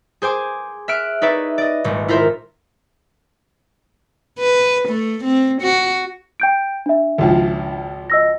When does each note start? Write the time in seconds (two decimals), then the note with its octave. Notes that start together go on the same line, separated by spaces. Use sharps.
0.22 G#4 C5 G#5 D6
0.88 E5 F6 F#6 D7
1.22 D#4 B4 C#5 D5 E5
1.58 D5 D#5
1.84 D#1 G#1
2.08 E4 F4 A#4 C5 E5
4.39 B4
4.89 A3
5.24 C4
5.62 F#4
6.40 G5 G6 D7
6.86 D4 E5
7.18 G#1 C#2 F3
8.10 D#5 E6 A#6